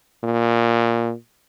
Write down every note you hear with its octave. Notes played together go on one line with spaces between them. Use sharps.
A#2